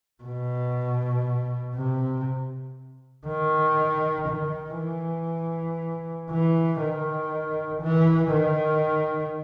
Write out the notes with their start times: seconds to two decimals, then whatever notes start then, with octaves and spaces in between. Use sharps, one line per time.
0.24 B2
1.76 C3
3.27 D#3
4.29 D#3
4.79 E3
6.31 E3
6.81 D#3
7.82 E3
8.33 D#3